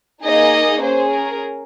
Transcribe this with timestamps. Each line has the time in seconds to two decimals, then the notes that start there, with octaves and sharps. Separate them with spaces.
0.22 A#3 D#4 G#4 D#5
0.81 C#4 G#4 C5
1.10 A#4